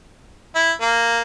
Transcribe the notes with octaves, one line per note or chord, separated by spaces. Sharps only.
E4
A#3